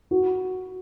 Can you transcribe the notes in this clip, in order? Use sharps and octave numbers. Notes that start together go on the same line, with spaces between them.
F#4